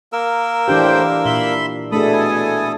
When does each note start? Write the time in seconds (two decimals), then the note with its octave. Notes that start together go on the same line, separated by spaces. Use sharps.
0.13 A#3 A#4 E6
0.68 A2 E3 D4 G4 C5 G5
1.25 A#2 E5 B5 C6
1.92 B2 A3 D4 G#4 A4 B5 D#6
2.13 E4 G#5